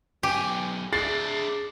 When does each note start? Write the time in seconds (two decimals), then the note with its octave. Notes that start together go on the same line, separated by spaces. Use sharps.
0.23 B1 G4 G#5
0.93 D4 E4 G#4 A6 C7